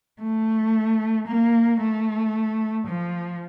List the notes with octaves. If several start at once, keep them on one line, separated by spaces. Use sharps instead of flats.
A3
A#3
A3
F3